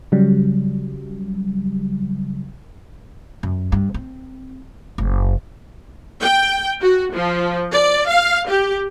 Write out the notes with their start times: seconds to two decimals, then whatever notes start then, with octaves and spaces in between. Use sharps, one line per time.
0.12 C#3 F#3 G3
3.43 F#2
3.72 G2
3.94 C4
4.98 F#1
6.21 G5
6.82 F#4
7.15 F3
7.73 D5
8.07 F5
8.49 G4